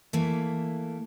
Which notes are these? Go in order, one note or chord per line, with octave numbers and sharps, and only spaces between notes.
E3 A3 A#3